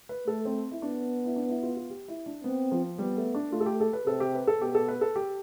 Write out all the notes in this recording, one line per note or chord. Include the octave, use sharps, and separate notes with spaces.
B4
A3 A4
C4
E4
B3 D4
E4
D4
E4
F4
F4
G4
E4
D4
B3 C4
F3
G3 B3
A3
D4
A3 F4
A4
G4
A4
B4
C3 A4
G4
B4
A4
B2 G4
A4
B4
A4
G4